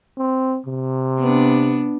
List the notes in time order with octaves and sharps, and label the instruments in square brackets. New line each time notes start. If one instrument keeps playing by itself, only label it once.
[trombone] C4
C3
[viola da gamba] B3 D4